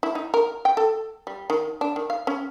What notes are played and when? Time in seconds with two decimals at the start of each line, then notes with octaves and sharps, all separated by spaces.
0.03 E4
0.15 D#4
0.34 A#4
0.65 G5
0.77 A4
1.27 G3
1.50 D#3
1.81 D4
1.96 D#3
2.10 F5
2.27 C#4